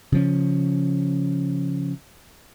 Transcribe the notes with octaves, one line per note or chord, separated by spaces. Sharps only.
C#3 F3 C#4